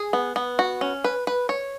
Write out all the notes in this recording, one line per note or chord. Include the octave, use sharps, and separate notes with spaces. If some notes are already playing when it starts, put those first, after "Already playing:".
Already playing: G#4
B3
B3
F#4
C#4
B4
B4
C#5